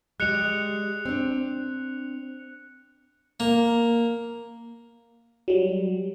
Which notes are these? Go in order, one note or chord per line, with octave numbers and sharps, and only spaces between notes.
G3 G#3 F#6 C#7 F7
C4 D4
A#3
F#3 G3